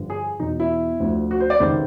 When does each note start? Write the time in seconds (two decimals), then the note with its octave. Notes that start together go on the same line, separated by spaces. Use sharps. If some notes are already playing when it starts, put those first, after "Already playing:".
Already playing: G2 D3 F3
0.10 G#4
0.39 E2 B2 D#4
0.60 E4
1.00 D2 D3 F3
1.31 F#4
1.40 C5
1.50 D5
1.60 C#2 C3 D#3 C5